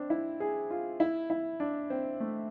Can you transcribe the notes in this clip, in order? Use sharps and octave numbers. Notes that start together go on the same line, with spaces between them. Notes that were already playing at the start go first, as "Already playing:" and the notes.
Already playing: C4 D4
E4
G#4
F4
E4
E4
D4
C4
A3